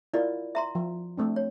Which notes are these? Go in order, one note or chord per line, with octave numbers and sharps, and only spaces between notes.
E4 F4 A#4 D5 D#5
E5 A#5 C6
F3
A3 C4 D4
C#5